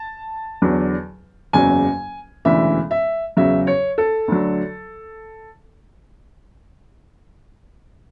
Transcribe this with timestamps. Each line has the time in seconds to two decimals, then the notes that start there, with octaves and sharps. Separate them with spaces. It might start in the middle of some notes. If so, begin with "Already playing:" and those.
Already playing: A5
0.62 E2 D3 F#3
1.53 F#1 E2 C#3 F#3 G#5
2.45 E1 D2 C#3 E3 E5
2.91 E5
3.37 E2 C#3 F#3 E5
3.67 C#5
3.98 A4
4.28 D2 D3 F#3